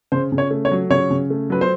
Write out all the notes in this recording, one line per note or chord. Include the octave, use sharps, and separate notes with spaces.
C#3 C5
C#3
C#5
A3
C#5
F#3
C#3 C#5
C#3
A3
F#3 B4
C5